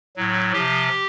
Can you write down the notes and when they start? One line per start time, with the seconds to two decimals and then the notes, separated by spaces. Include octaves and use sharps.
0.16 A2 F#3
0.52 C3 F3 G4